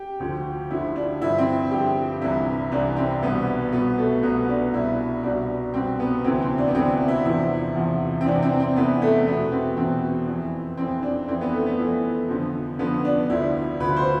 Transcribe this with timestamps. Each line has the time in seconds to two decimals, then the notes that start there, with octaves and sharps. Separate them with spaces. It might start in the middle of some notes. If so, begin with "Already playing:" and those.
Already playing: G4
0.20 D2 D3 F3
0.71 D2 D3 F3 E4
0.96 D4
1.21 G2 D3 F3 E4
1.38 C4
1.71 G2 D3 F3 G4
2.22 C2 C3 E3 E4
2.72 C2 C3 E3 D4
2.97 C4
3.22 C2 B2 B3
3.72 C2 B2 B3
3.98 A3
4.23 C2 B2 B3
4.49 D4
4.73 C2 B2 E4
5.23 C2 B2 D4
5.74 C2 B2 C4
6.00 B3
6.24 D2 C3 E3 C4
6.42 C4
6.58 D4
6.68 B3
6.74 D2 C3 E3 C4
7.08 E4
7.25 E2 C3 F3 E4
7.75 E2 C3 F3
8.21 C4
8.26 E2 C3 E3 D4
8.42 C4
8.60 C4
8.76 E2 C3 E3 B3
9.02 A3
9.26 E2 B2 B3
9.52 C4
9.77 E2 B2 C4
10.27 F2 E3
10.77 F2 E3 C4
11.03 D4
11.28 F2 E3 C4
11.41 B3
11.53 A3
11.66 B3
11.79 F2 E3
12.28 F2 D3 F3
12.79 F2 D3 F3 B3
13.05 D4
13.30 D2 D3 F3 E4
13.80 D2 D3 F3 B4
13.97 C5